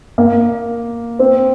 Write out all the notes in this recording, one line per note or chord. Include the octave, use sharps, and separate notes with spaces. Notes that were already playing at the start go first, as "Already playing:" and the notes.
A#3
C4